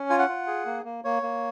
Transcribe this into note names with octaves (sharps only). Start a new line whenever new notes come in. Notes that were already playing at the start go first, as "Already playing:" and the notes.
Already playing: C#4
F4 G#5
F#5
F4
G#4
A#3
A#3
A#3 C#5
A#3